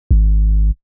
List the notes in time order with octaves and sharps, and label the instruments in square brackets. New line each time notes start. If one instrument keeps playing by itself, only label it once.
[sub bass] G#1